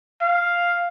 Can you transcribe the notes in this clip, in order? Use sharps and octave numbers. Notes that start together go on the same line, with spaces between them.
F5